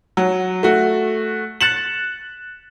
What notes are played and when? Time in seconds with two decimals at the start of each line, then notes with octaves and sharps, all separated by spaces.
0.17 F#3
0.63 A3 F#4
1.61 F#6 A6 C#7 E7 F#7